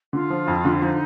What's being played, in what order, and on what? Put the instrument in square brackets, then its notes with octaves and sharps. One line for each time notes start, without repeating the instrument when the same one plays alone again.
[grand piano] D3 [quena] F4
[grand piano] F3
F2
D3
[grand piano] F3 [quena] D#4